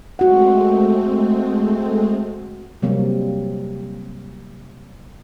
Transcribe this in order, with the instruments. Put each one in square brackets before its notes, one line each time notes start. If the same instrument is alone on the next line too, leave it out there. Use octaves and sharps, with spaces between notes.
[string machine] G#3 A3 C4 [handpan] F#4 F#5
[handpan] C3 F#3 G3 A#3 C4